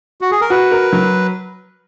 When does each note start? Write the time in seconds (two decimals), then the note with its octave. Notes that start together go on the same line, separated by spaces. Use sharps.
0.21 F#4
0.31 G#4
0.41 A#4
0.50 F#4 B4
0.72 A#4
0.93 F#3